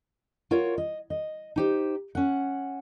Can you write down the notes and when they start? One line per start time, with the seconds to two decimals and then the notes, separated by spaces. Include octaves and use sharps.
0.51 F4 F#4 A#4 C#5
0.78 D#5
1.10 D#5
1.56 D#4 G4 C5
2.15 C#4 F#5